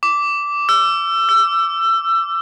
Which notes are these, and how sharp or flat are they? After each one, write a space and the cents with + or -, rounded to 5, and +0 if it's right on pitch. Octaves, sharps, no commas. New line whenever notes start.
D6 -10
E6 +30
E6 +25